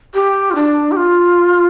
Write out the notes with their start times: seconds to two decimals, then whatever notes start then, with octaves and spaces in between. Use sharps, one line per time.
0.14 G4
0.51 F4
0.55 D4
0.92 G4
0.97 F4